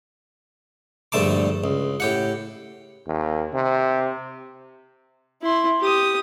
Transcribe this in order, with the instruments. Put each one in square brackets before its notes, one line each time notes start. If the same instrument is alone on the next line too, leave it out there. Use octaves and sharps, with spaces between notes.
[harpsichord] A#1 G2 D3 A3 A5 D6
C#2
A2 G4 F#5
[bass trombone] D#2
C3
[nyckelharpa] E4 C6
G4 D#6